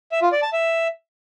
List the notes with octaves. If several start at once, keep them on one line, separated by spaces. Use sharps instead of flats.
E5
F4
D5
A5
E5